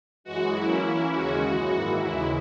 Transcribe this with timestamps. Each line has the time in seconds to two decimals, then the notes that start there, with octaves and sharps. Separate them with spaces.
0.24 F#2 E3 G#3 F#4
0.54 F#3 A#3 C#4 E4
0.83 E3 A#3 C#4 E4
1.12 D#2 C#3 G#3 C#4 F#4
1.41 F#2 E3 G#3
1.70 G#2 D#3 A#3 E4
1.99 D#2 C#3 E3 G#3 E4